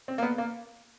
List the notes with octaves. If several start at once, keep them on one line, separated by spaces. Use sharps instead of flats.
C4
A#3
B3
A#3